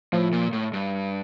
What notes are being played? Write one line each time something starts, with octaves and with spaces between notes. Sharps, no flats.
A2 F3
A#2
A2
G2